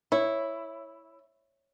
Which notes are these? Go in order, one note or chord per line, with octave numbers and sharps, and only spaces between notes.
E4 C#5